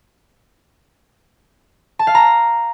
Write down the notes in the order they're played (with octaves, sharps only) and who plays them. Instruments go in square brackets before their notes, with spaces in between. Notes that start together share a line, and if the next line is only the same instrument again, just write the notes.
[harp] A5
F5
A#5